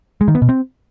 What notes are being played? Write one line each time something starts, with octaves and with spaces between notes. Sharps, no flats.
G#3
D#3
B3
B2
C4